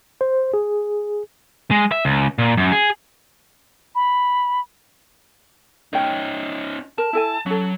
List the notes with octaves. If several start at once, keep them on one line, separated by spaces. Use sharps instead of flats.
C5
G#4
G#3
E5
C#2
A#2
F#2
G#4
B5
C#4 D#4 C#5 G5
A#4 A5
E4 A4 G#5
F#3 C#4 A4